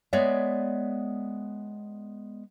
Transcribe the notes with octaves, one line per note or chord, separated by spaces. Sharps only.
G#3 B3 C#5 D5 E5